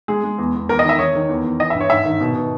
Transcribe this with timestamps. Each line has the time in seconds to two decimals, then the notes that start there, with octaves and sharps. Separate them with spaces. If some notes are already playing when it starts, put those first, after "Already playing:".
0.08 G#3 G#4
0.24 G#3
0.38 E2
0.54 E2
0.69 E2 A#4
0.79 D#5
0.84 D#3 E5
0.99 D#3 C#5
1.15 D#3
1.29 E2
1.44 E2
1.60 E3 D#5
1.70 E5
1.75 G2
1.81 C#5
1.90 G#2 E5
2.05 D#3
2.21 B2
2.35 B2